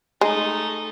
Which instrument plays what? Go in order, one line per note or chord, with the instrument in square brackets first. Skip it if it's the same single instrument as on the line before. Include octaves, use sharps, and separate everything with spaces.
[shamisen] G#3 [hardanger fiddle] A3 D#4